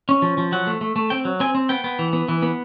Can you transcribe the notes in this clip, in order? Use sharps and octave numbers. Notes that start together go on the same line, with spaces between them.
C#4
F3
F3
F#3 F#5
A3
A3
A3
C4 G5
F#3
C4 G#5
C4
B3 G5
B3
E3
B3
E3
B3